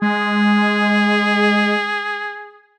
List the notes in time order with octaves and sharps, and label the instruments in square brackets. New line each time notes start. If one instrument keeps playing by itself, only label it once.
[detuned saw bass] G#3 [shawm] G#4